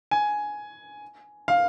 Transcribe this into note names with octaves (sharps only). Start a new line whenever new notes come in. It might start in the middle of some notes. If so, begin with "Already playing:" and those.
G#5
F5